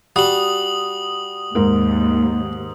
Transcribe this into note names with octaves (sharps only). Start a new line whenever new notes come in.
G3 F#4 D#6 F#7
D#2 G#2 A#4